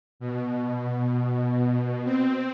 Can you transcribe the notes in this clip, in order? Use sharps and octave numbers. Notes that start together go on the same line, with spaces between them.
B2
C4